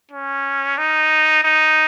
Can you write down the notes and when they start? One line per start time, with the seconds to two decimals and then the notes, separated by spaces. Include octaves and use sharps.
0.11 C#4
0.78 D#4
1.44 D#4